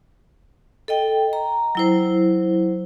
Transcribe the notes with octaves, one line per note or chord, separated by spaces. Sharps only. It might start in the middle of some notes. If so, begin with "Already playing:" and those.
A4 D#5 G5
A#5
F#3 E4 C5